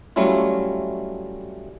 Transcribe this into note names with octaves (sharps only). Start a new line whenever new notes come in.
F#3 G3 A3 C#4 E4 F4